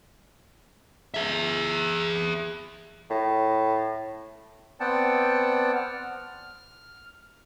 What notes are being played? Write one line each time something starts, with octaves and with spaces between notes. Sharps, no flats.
G#4 E5
A2
B3 C4 D5 F#5 G5 A5
F6